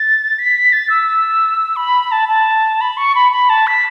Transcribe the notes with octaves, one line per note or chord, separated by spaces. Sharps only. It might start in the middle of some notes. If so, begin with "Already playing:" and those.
Already playing: A6
B6
A6
E6
B5
A5
A5
B5
C#6
B5
B5
A5
B6